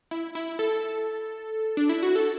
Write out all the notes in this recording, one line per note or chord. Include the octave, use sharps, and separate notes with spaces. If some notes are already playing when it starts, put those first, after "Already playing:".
E4
E4
A4
D4
E4
F#4
A4